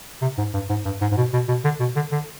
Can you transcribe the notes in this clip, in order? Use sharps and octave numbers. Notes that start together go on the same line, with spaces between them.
C3
G#2
G2
G#2
G2
G#2
G#2
B2
B2
B2
D3
B2
D3
D3